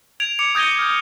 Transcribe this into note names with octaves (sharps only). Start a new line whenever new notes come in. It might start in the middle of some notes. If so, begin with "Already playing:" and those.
G#6 D7 F7
D6 C#7 F7
D#6 G6 G#6 A#6 D#7 G7
F6 G6